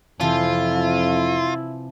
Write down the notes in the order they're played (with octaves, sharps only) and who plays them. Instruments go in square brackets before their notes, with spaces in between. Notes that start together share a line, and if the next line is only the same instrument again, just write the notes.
[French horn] F2 [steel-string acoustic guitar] C3 E3 F3 [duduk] E4 [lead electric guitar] F4